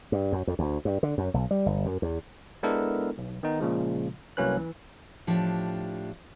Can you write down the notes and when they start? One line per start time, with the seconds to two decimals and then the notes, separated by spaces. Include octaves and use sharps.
0.12 G2
0.33 F#2
0.47 F2
0.59 D2
0.85 G2
1.03 D3
1.18 F#2
1.34 B1
1.51 G3
1.66 G1
1.86 F#2
2.02 E2
2.63 G#3 B3 D4 E4 A4 A#4
3.18 B1
3.43 D#3 B3 D#4
3.60 A#2 C#3 F3 G#3
4.37 C2 F#3 A#3 C#4 B4 F#6
4.57 E3
5.27 A2 F3 D4 G4